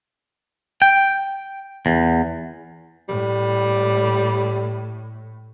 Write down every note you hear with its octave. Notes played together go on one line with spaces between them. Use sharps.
G5
E2
A2 G3